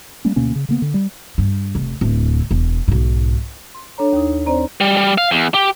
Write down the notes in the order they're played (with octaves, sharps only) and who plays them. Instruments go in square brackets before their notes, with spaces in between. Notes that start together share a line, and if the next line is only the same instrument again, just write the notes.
[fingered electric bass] G3 A3 A#3 C#4
D2 B2 A#3 C#4
C#3
C#3 A#3 B3
D3
G3
[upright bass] G2
F1
D1 E4
E1
B1 G#2
[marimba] C6
D4 A4 C#5 A#5
D#2 D#4
C4 C5 D5 A#5
[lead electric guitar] G3
G3
F5
E2
G4